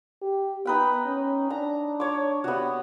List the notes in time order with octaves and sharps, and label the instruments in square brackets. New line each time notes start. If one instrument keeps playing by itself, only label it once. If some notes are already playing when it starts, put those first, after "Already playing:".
[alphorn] G4
[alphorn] B3 [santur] D#4 B4 G5
[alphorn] C#4
[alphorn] D4 [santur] A#5
[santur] C#5 D6
[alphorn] C3 [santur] B3 F#4